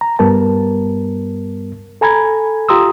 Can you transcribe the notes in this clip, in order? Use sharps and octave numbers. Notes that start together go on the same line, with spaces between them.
A#5
G2 G3 B3 A#4 A5
A4 G#5 A#5 B5 G#6
F4 G4 A#5 C6 D#6 E6